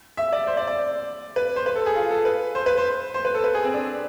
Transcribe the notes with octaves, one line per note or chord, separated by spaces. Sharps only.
E5
D5
C5
D5
D5
B4
C5
B4
A4
G#4
F4
A4
B4
C5
B4
C5
C5
B4
A4
B4
G#4
C4
D4